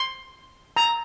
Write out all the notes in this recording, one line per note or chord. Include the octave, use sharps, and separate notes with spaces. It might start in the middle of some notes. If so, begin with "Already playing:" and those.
Already playing: C6
A#5